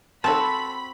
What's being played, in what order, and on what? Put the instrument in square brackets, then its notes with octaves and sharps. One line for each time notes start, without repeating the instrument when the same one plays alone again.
[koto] C4 F#4 [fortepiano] A4 A5 [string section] B5